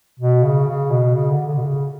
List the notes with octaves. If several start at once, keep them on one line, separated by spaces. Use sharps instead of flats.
B2
C#3
C#3
B2
C#3
D3
D3
B2
C#3